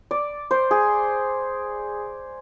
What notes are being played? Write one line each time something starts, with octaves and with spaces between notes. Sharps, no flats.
D5
C5
G#4